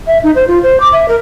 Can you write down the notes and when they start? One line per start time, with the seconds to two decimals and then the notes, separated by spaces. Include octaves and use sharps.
0.07 E5
0.23 D#4
0.35 C5
0.47 F4
0.63 C5
0.80 D6
0.92 E5
1.08 A#4